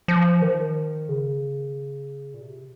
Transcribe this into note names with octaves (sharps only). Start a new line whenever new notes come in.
F3
D#3
C#3
A#2
C3